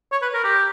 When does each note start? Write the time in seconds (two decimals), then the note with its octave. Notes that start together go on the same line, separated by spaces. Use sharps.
0.12 C#5
0.22 B4
0.34 A#4
0.44 G4